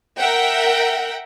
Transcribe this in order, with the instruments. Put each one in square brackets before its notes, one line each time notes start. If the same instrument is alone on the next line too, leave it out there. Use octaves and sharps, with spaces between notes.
[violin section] A#4 E5 F#5 G5